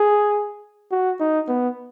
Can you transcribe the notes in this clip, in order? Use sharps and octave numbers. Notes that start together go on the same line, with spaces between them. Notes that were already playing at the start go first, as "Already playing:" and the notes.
Already playing: G#4
F#4
D#4
B3